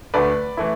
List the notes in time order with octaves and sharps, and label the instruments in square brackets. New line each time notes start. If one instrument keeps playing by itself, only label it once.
[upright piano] D2 D3 A3 B4 D5
E3 A3 E4